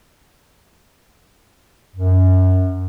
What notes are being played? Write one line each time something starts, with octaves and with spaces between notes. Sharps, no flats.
F#2